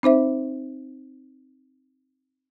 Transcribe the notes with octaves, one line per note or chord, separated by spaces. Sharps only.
C4 D#4 C5 E5